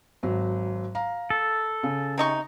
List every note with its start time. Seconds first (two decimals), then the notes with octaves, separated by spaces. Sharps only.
0.23 G#1 F#3
0.95 F5 A#5
1.30 A4
1.83 C#3
2.18 C3 D#4 C#6